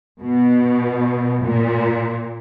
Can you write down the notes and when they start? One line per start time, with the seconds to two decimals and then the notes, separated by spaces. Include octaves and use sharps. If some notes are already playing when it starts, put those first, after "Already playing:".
0.21 B2
1.44 A#2